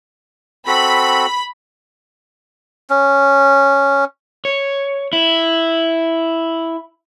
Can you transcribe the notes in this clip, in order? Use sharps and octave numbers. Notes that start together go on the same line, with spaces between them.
C4 F#4 A4 B5
C#4
C#5
E4